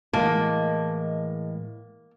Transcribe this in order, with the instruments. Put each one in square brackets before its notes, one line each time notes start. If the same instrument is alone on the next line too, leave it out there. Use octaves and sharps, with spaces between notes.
[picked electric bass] A2 E3 [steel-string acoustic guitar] G#3 D#5 A5 [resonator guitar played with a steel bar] A#3